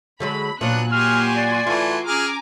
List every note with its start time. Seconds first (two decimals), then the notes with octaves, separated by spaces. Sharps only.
0.20 D3 F#3 G#3 B5
0.61 A#2 F#3 A#3 B3 D4 F#6
0.92 F#4 G4 G#5 C6 F6
1.36 D5
1.67 E3 A3 F4
2.07 C#4 G#4 G#5 A#5 D6 F6